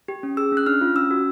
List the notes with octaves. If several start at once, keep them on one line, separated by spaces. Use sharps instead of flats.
G4
C#4
G#4 E6
C#4 F#6
D4 F6
F4
C#4 E6
F#4